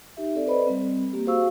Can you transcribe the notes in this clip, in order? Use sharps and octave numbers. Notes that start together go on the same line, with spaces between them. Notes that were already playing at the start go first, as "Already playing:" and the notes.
D#4 G4 E5
C4 A4 D5
A4 B4 C5 D5 D#5 B5
G3 C4
A#3 G4
F#4 G#4 C5 F5 C#6 E6